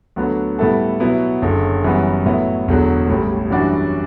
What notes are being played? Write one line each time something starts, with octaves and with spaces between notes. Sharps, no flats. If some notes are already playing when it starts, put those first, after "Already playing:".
D2 D3 F#3 B3
A2 G3 B3 E4 A4
B2 F#3 B3 E4
F#1 F#2 D3
F#2 E3 G3 B3
A2 F#3 B3 E4
E1 E2 D3 F#3
A1 A2 G3
F#2 E3 G3 D4 F#4